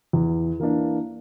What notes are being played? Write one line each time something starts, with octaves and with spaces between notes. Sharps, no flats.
E2
E3 A#3 D4